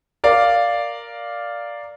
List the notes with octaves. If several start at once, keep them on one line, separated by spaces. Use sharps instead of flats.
A#4 D5 F5